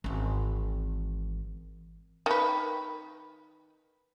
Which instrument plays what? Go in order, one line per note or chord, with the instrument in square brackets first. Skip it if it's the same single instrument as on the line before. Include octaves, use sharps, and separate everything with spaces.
[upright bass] G#1 E3
[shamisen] D#3 B4